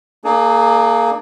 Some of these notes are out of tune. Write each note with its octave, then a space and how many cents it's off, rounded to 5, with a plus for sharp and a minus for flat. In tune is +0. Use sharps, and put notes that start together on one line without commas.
A#3 -10 D4 +40 G#4 +30